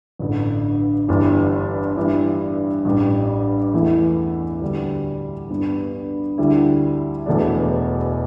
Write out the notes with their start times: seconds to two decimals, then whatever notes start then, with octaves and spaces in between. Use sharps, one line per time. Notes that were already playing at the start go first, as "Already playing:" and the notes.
0.19 A1 G2 D3
1.08 G1 G2 E3 G3 D4
1.97 G2 E3 G3
2.85 A1 G2 G3
3.74 E2 E3 A3 E4
4.61 D2 D3 G3
5.50 G2 G3 B3
6.38 D2 D3 G3 E4
7.26 E1 E2 B2 A3 D4